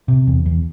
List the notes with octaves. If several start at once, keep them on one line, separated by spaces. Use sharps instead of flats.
C3
E2
E2